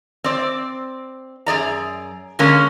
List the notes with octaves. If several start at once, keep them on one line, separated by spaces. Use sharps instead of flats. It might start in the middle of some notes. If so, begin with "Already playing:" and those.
C4 D5
F#2 G#4 D5 A#5
D3 G#3 A#3 C#4